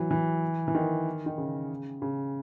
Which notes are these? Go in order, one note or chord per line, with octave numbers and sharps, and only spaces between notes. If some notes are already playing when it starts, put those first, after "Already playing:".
Already playing: E3 F#3
E3
E3
D#3
D#3
C#3
C#3